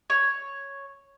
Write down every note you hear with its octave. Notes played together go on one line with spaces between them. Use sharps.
C#5